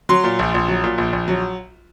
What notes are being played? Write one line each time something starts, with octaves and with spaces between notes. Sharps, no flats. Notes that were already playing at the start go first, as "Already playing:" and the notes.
F#3 C6
A#2
A#1
A#1
F#3
A#2
A#1
A#1
F#3